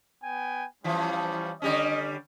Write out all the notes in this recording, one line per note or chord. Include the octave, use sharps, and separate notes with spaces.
B3 G5 G#5
E3 F3 G3 C#4
D3 G3 C#4 D#5